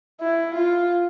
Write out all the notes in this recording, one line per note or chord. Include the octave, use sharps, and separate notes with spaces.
E4
F4